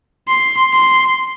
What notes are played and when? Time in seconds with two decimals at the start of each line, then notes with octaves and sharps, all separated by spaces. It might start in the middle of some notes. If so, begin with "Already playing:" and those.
0.28 C6
0.73 C6